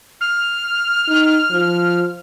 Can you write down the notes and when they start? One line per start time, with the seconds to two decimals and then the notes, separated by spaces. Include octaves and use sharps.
0.21 F6
1.08 D#4
1.51 F3